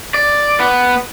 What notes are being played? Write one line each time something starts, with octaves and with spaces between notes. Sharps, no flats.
D5
B3